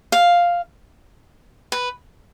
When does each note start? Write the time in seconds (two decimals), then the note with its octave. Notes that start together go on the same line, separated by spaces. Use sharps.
0.12 F5
1.72 B4